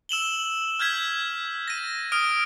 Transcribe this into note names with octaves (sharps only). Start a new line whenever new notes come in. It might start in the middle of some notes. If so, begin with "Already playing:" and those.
E6 E7 F#7 G7
F6 G6 G#6 B6
A#6 D#7
D#6 F6 D7